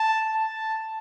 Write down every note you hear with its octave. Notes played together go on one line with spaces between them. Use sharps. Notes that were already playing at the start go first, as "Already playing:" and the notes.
Already playing: A5
A5